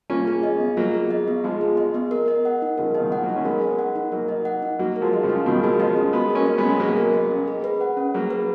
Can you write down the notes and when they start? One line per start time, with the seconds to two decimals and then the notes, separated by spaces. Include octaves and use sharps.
0.10 A#3 C#4 F4
0.28 G#4
0.43 D#5
0.60 B3
0.77 F#3 A#3 F4
0.94 G#4
1.11 D#5
1.28 B3
1.44 F3 G#3 F4
1.61 G#4
1.77 D#5
1.94 B3
2.11 A#4
2.28 D#5
2.45 F#5
2.62 D#4
2.78 C#3 F3 A#4
2.95 F3 D#5
3.00 B2 D#3
3.12 F#5
3.23 F#3 A#3
3.29 D#4
3.36 C#4
3.45 G#3 B3 A#4
3.62 D#5
3.79 F#5
3.95 D#4
4.12 F#3 A#3 A#4
4.28 D#5
4.45 F#5
4.62 D#4
4.79 F#3 A#3 F#4
4.96 A#4
5.01 F3 G#3
5.13 D#5
5.23 C#3 F3
5.29 C#4
5.46 B2 D#3 F#4
5.63 F3 G#3 A#4
5.79 F3 G#3 D#5
5.96 C#4
6.13 G#3 B3 F#4
6.30 A#4
6.35 A#3 C#4
6.46 D#5
6.58 G#3 B3
6.63 C#4
6.69 G#3
6.80 F#3 A#3 F#4
6.97 A#4
7.14 D#5
7.31 C#4
7.48 G#4
7.64 B4
7.81 F#5
7.97 C#4
8.14 F#3 A#3 G#4
8.30 B4